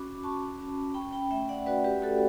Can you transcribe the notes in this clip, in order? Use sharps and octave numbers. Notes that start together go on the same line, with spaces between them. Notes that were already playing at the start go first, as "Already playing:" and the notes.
Already playing: C#4 F#4 B5 D6
F#4 A5 C#6
C#4
C#4 G5 B5
G5 B5
A3 E5 G5
D5 F#5
F#4 B4 D5
G4 B4
A3 F#4 A4